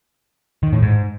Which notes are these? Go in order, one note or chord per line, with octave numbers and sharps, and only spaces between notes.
D#3
A2
G#2